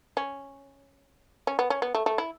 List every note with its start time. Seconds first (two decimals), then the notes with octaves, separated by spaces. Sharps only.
0.17 C#4
1.47 C#4
1.59 B3
1.70 C#4
1.82 B3
1.95 A3
2.06 A3
2.18 E4